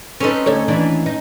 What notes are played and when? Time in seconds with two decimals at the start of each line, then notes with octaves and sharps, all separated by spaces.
0.20 C4 C#4 D#4 A4 B4
0.46 D2 A4 C#5
0.68 D#2 E3 D4
1.06 D#4